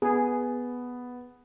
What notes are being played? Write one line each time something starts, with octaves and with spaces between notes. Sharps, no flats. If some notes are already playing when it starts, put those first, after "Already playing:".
B3 G#4